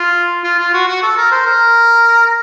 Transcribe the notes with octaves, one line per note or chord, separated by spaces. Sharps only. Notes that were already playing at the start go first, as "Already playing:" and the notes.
Already playing: F4
F4
F4
F#4
F#4
A4
A#4
C5
A#4